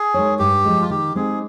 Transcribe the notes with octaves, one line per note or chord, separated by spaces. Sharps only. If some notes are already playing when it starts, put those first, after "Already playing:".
Already playing: G#4
G#3 D#4 A#4 C#5
G2 G4
F3 G#3
F4
D#3 G4
G#3 C4 D#4 G4 G#4